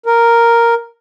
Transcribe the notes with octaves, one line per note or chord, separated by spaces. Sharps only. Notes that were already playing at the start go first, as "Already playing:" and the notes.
A#4